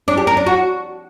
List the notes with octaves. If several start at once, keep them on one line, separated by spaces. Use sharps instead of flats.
D4
G4
A#4
D4
F#4